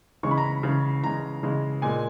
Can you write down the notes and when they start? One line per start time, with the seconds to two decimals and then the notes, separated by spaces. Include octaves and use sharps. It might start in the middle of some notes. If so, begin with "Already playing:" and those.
0.23 C#3 E3 G#3 C#6
0.31 B5
0.38 A#5
0.46 B5
0.63 C#3 E3 G#3
1.03 C#3 E3 G#3 A#5
1.43 C#3 E3 G#3
1.82 A#2 G#3 G#5